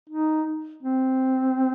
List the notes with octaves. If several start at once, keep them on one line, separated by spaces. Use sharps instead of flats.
D#4
C4